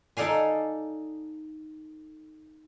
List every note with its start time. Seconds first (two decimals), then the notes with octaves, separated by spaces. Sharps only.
0.17 D#4 A4 D5 F5 G#5